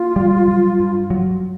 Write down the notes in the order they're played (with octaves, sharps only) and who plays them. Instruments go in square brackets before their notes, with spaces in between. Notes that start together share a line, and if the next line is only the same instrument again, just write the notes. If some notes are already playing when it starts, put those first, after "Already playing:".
Already playing: [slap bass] A#3 [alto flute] F4
[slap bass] G3
F#3
G2
F#3